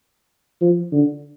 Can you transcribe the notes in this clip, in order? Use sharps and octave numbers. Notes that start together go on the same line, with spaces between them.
F3
D3